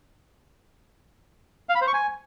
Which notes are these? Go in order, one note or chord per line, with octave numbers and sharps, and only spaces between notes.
F5
B5
C5
C#6
G#5